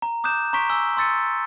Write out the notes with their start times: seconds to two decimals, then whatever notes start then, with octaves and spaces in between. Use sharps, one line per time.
0.02 A#5
0.24 D6 D#6 F#6 G6 E7
0.53 A#5 C6 C#6 B6 D7
0.69 G#5 E6 G7
0.97 C6 E6 A6 C#7 D#7